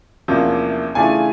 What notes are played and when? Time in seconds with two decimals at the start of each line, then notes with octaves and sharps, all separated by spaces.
0.28 E2 C3 F3 A#3 C#4
0.95 C#3 E3 A3 D4 F4 G#5